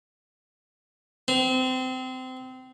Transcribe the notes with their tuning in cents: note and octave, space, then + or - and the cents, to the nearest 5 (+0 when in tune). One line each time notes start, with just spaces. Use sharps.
C4 -25